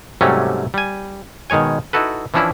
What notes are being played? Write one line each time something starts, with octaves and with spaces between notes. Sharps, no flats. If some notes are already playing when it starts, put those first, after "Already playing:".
G#2 C3 F#3 G3 A3 C#4
G3 G#5
B2 D#3 G#3 C#5 G#5
D#4 E4 F#4 A4 B4
E3 F3 C#4 D4 E4